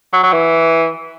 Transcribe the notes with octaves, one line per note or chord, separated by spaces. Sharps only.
F#3
F#3
E3